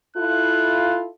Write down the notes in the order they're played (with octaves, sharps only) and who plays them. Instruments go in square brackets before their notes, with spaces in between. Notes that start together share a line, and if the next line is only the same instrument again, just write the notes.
[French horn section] E4 F4 A4 [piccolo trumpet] F#6